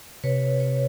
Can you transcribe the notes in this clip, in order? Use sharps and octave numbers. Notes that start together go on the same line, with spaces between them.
C3 B4 C#5
B4 C#5